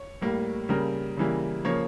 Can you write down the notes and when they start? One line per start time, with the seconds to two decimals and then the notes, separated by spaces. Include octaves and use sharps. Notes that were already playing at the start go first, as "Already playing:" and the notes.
Already playing: C#5
0.21 A2 G3 A#3
0.69 C#3 G3 A#3 A#4
1.17 C#3 E3 G3 A#3
1.65 C#3 F3 A#3 C#5